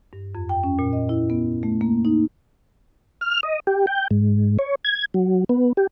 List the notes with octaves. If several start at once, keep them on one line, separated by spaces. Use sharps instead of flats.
G2
F2
G5
C#4
A#2
D#5
E4
B3
A3
A#3
D#4
F6
D#5
G4
G5
G#2
C#5
G#6
F#3
B3
G4